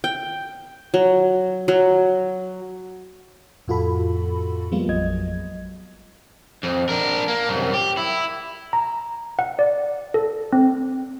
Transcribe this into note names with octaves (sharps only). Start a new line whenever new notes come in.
G5
F#3
F#3
F2 A2 F4 F#4 A4 B5
F3 G3 G#3 A#3 B3 F4
A1 F2 F#3 D#5 G#6
F2
D4 A#4
A#3
C2 F#2
G4
E4
A#5
F#5
D5
A4
C4